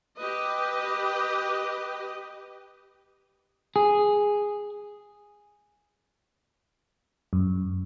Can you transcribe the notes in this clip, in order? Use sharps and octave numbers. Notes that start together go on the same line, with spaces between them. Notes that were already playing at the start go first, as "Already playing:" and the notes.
G4 B4 D#5
G#4
F#2